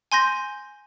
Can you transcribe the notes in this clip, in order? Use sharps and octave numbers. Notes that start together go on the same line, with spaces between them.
G#5 C6 G6 A#6